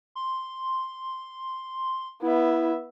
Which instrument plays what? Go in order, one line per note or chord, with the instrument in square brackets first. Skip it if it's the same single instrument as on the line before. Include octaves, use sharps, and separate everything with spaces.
[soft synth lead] C6
[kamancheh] B3 E5 [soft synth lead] E4